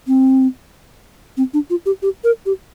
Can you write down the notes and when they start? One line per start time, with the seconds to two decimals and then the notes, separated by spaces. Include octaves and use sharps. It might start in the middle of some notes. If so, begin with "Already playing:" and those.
0.07 C4
1.37 C4
1.54 D4
1.70 F4
1.86 G4
2.02 G4
2.24 A#4
2.46 G4